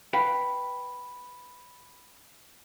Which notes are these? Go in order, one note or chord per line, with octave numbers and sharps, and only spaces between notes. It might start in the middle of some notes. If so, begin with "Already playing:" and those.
B4 F5 G5 B5